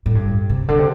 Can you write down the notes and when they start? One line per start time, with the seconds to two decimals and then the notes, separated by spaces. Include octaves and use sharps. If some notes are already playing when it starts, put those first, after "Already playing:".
0.06 A2
0.15 G2
0.50 C3
0.68 D3
0.79 C3